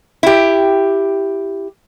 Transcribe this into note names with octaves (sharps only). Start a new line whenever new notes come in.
E4 G4